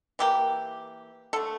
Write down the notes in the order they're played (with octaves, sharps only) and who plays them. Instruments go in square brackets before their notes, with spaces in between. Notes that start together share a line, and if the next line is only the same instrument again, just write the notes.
[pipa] E3 A#3 G4
D3 A3 A4